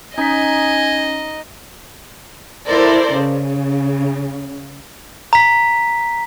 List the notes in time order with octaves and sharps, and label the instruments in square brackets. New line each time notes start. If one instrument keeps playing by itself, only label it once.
[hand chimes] C#4 A#5 B6 [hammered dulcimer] D#4 [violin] D#5 [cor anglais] G#5
[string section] E4 A4 A#4 C5 D5
C#3
[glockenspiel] A#5 B6